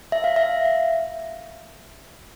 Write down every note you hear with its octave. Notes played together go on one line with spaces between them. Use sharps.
E5
F5
E5